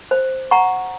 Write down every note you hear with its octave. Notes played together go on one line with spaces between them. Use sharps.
C5
F#5 A#5 C#6